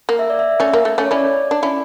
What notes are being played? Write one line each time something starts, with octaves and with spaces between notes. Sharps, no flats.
A#3
E5
D5
E5
A3 C#4
A#3
A3
A3 C#4
C#5
C#4 E4 D5
D4
C#4 E4